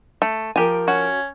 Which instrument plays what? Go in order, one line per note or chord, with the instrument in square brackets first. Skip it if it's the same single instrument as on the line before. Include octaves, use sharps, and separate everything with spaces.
[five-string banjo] A3
[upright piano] F3 A#4 [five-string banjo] G4 G#5
[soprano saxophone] C#4 [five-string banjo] F#4